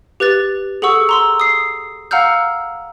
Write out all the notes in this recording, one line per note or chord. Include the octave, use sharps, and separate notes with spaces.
G4 B4 F#6 A6
G#4 A4 F#5 C#6 E6
A#5 C6 E6
D#6 C7
F5 F#5 A#5 E6 F6 G6